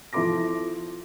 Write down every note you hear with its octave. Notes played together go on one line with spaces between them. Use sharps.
F3 E4 A4 C6 D6 A#6